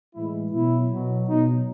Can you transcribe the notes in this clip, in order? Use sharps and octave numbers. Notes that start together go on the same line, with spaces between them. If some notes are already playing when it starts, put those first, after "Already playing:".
A2 E3 G#3 E4
B2 F#3 E4
B2 F#3
B2 F#3 D#4